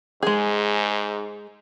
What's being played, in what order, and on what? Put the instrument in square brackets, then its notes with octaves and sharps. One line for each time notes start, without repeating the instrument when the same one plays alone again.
[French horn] G#2 [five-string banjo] G#3 G#4